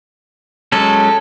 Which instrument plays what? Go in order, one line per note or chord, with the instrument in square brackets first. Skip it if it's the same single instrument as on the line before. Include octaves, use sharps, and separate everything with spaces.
[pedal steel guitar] F#3 G#3 C#4 [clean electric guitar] A4